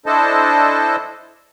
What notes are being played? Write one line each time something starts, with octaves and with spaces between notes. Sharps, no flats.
D4 E4 A4 C5 D#5 A5